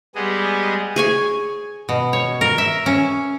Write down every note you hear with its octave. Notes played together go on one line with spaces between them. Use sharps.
G3 G#3 B3 G#4 D#5
G#4 C#5 G#5
B2
C#5
A#4
E5
C#4